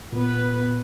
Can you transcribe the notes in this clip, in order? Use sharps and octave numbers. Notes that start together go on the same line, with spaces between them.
A#2 B3 B4